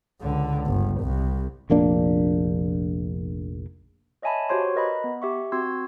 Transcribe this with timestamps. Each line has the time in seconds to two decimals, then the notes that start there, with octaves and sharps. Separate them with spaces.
0.21 C#2 D3
0.67 G1
1.01 C2
1.70 F1 A#1 A#3 D4
4.22 C#5 D#5 E5 G#5 A5 B5
4.49 F#4 G4 C5 C#5 C6
4.75 A#4 B4 D#5 A#5 B5
5.04 B3
5.22 G4 E5 C#6
5.52 C4 F#4 C6 E6 G#6